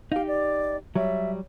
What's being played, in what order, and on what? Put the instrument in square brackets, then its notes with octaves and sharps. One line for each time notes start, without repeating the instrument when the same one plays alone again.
[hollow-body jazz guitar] D#4 G4 [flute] F5
[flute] D5
[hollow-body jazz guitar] F#3 G3 [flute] E5